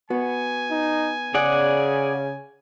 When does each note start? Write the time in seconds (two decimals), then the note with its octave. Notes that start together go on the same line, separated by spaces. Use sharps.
0.10 B3 F#4 G#5
0.71 D#4
1.34 C#3 G#4 D5 F#5